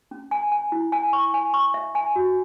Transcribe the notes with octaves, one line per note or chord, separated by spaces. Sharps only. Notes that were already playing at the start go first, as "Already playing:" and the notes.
C#4
G#5
G#5
E4
G#5
C#6
G#5
C#6
E5
G#5
F#4